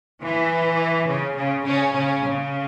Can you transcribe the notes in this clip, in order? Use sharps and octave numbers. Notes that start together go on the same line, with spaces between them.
E3
C#3
C#3
C#3 C#4
C#3 C#4
C#3